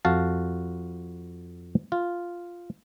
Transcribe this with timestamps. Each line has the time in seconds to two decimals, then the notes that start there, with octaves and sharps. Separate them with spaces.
0.05 F2 F#4 F5 A5
1.92 F4